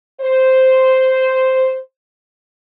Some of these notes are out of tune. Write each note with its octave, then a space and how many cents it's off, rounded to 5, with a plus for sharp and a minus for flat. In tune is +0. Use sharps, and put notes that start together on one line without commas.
C5 -5